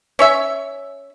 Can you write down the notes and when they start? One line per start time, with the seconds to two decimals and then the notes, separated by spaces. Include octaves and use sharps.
0.19 C#4 C#5 E5